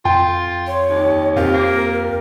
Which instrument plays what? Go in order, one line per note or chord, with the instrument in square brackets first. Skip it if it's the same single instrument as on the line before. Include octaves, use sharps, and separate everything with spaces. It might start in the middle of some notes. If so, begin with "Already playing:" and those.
[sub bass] F2 [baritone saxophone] F4 [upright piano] G5
[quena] C#5
[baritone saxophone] D#2
[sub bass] F2 [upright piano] C4 F4 G4 [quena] A#4
[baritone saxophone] A#3